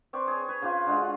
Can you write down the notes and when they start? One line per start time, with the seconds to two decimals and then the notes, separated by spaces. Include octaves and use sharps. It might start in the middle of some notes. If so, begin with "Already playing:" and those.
0.13 C4 B4 D5 C#6
0.27 G#4 C#5
0.48 B4 C#5
0.62 C#3 F4 G4 B4
0.87 D3 G#3 F#4
1.01 F4